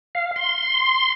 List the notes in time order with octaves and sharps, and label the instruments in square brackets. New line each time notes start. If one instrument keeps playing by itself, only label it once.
[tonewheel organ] F5
C6